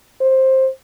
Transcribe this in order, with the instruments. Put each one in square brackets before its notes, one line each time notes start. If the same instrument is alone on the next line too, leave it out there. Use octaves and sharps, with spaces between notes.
[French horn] C5